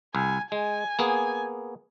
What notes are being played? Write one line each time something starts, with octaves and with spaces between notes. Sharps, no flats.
C2 G#5
G#3 G#5
A#3 B3 G#4